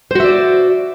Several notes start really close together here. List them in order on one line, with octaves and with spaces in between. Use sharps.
C5 F#4 E5 D5